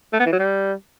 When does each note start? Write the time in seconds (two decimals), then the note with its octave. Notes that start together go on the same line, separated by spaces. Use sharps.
0.13 A3
0.20 B3
0.26 E3
0.33 F#3
0.39 G3